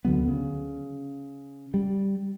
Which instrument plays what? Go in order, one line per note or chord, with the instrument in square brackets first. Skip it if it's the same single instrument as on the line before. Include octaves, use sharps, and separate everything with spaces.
[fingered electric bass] D2 D3 F#3 B3
C#3
G3